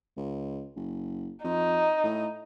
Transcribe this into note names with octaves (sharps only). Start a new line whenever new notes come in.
C#2
F#1
F2 D#4
A2